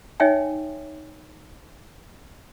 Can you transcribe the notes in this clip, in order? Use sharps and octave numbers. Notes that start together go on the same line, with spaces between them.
D#4 C#5 E5 G5 G#5